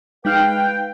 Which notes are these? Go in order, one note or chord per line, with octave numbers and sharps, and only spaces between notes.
G#3 D#4 B4 F5 G5 F6